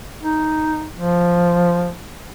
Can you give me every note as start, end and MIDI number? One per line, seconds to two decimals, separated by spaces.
0.22 0.88 63
0.93 1.93 53